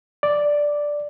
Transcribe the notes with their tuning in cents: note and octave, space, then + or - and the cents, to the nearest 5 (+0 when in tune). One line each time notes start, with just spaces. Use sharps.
D5 +0